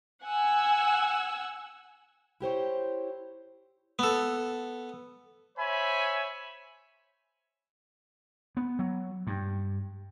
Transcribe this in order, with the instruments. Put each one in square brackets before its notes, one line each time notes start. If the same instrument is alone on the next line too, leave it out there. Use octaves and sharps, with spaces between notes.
[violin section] F#5 G#5 E6
[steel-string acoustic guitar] E4 G4 C5 C#5
[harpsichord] B3 A4
[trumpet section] C5 C#5 E5 G#5 B5
[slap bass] B3
F#3
G2